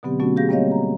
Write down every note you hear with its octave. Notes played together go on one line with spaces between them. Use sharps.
B2 D3 F#3 B3 C4 G4
F#3 A3 B3 C#4 F#4
G4 G#4 F5 G6 A#6
G3 A#3 C4 C#5 D#5 F5
A#5